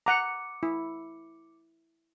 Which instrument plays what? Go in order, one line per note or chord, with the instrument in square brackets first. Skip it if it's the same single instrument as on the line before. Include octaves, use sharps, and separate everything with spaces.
[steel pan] F#5 A#5 [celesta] D6 C#7
[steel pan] E4